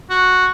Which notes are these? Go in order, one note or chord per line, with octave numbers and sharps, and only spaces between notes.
F#4